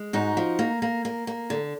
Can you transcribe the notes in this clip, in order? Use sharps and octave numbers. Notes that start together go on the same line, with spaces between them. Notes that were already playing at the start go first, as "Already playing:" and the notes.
Already playing: G#3
G#2 D#4 F#4
F3
A#3
A#3
A#3
A#3
D3